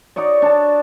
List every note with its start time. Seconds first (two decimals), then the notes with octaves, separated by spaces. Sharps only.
0.16 D#4 F#4 C#5 D5
0.42 D4 A5